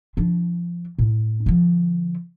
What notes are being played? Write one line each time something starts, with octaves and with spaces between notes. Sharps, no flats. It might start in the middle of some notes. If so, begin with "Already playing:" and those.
F3 D4
A2
D3 F3